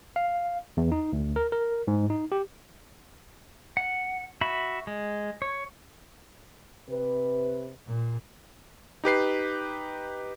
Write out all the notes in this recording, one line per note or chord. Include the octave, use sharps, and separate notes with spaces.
F5
E2
D#4
D2
A#4
A#4
G#2
D#4
G4
F#5
F#4 E5 B5
G#3
C#5
C3 B4
A#2
D#4 G4 B4 C7